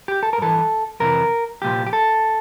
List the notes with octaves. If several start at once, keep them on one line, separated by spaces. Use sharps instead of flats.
G4
A4
A#4
G2 E3 A4
F2 C3 E3 A#4
C2 A#2 F3 G4
G4
A4